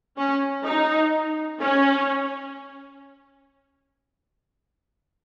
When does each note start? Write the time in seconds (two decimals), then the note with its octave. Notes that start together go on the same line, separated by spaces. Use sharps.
0.17 C#4
0.66 D#4
1.62 C#4